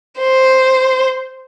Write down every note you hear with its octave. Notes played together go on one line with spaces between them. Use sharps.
C5